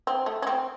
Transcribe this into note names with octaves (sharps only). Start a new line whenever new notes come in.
C4
A3
C#4
C4